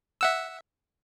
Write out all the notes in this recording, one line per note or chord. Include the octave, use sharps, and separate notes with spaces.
E5 F#5 E6